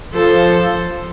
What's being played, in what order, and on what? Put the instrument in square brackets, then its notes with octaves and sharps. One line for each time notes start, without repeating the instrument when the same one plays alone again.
[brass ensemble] F3 [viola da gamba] A4 C5